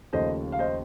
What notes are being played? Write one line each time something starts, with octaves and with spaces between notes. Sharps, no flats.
D#2 C#3 F3 A3 C5 D#5
F5
C5 D#5